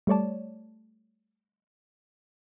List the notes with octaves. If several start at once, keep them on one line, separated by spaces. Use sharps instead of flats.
G3 A3 C#5 D5 A5